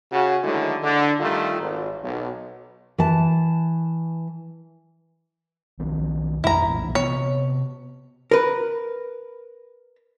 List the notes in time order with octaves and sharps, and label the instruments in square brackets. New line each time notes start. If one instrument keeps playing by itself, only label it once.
[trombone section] C#3 F#4
D3 D#3 F#3 G#3 A3 E4
D3
D#3 G3 A3 F4
G#1
B1
[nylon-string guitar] E3 A5
[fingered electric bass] B1 D#3 C4
[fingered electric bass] A1 F2 G#3 [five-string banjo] E4 A#5
[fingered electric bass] B1 A#2 E3
[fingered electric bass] C3 B3 [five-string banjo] C#5
[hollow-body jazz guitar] A#4 B4